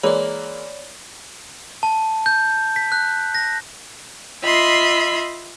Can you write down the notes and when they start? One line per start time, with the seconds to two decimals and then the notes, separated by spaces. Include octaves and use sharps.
0.03 E3 G#3 A#3 C#5 D5
1.83 A5
2.26 G6
2.76 B6
2.92 F#6
3.35 A#6
4.44 F4 D#5 E5 B5 C6